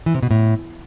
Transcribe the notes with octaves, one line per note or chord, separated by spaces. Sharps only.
E3
C3
B2
A2